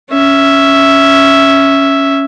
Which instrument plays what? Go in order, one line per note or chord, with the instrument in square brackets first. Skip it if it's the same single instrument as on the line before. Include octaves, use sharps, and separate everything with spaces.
[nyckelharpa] C#4 E5